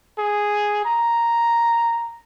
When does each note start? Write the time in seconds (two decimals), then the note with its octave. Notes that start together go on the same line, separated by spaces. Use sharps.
0.19 G#4
0.85 A#5